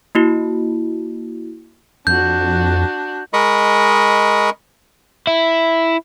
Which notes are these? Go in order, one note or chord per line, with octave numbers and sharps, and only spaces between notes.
A#3 E4 F#4
F2 D4 F#4 G6
G#3 A#4 D#5 B5 C#6
E4